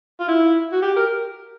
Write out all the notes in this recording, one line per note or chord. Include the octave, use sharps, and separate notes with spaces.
F4
E4
F#4
G4
A#4